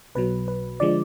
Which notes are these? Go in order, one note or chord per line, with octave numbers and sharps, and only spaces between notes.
B1 B2 F#3 B4
B4
D3 F3 G#3 D5